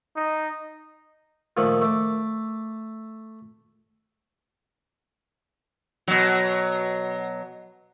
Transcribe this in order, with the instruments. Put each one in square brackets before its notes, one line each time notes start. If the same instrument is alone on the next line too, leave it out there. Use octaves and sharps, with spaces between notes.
[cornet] D#4
[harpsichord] A#2 D#3 F3 A3
A3 D6
[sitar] B2 F#3